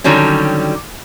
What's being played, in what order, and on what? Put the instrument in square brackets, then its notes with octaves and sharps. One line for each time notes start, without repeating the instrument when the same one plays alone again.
[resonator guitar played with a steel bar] D3 D#3 F#3 G3 C#4